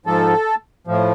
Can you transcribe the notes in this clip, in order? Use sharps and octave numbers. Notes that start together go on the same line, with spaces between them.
G#2 F3 A4
A2 F3